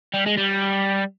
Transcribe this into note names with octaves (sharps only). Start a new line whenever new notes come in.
G3
G#3
G3